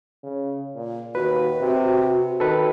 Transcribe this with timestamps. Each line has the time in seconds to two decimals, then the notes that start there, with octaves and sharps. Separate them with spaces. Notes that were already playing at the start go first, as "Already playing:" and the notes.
0.23 C#3
0.75 A#2
1.15 D#2 F#4 B4
1.60 C3
2.40 D#3 A4 B4